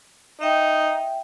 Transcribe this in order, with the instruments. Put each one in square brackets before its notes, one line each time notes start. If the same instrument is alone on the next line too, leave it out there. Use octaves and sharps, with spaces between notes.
[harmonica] D#4 [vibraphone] E5 G5